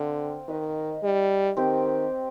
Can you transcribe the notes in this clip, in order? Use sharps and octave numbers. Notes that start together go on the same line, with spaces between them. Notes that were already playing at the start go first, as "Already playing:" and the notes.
Already playing: D3 C4 F5
D#3 D#4 B4 D#5
G3
D#3 C4 G4 C5